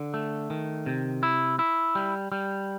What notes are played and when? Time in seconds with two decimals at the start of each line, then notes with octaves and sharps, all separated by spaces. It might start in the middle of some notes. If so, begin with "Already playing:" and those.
Already playing: D3
0.14 A3
0.50 D#3
0.86 C3
1.23 E4
1.59 E4
1.95 G3
2.32 G3